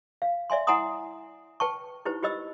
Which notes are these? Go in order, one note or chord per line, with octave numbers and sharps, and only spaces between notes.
F5
D5 E5 G#5 C6
E4 F#5 G#5 A#5 C6 D#6
B4 G5 A5 C#6
D#4 E4 G4 B4 C5
F4 G4 C5 D#5 E6